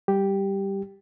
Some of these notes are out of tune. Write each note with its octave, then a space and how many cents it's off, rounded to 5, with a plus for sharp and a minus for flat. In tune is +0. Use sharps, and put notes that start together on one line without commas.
G3 +0 G4 +0